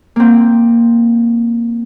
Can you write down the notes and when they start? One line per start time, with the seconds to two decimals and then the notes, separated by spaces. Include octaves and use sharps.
0.16 A#3 C4